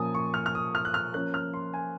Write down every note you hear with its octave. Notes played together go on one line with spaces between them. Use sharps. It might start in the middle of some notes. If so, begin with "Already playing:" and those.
Already playing: A#2 F3 A#3 C#4 G#5 D#6
C#6
F6
F6
D#6
F6
F#6
F6
F3 A#3 C#4 F#6
F6
C6
G#5